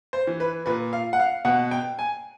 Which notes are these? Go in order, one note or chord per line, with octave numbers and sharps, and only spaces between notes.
C5
E3
B4
A#2 B4
F5
F#5
F5
B2 F#5
G5
G#5